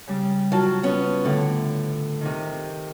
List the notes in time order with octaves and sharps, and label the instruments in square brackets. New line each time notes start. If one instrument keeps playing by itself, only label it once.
[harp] C#3 G3
[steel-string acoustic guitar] F#3 [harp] F4 A5 F6
[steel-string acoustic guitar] B3 C#4
[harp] A2 [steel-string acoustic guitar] D3
[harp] C3 D#3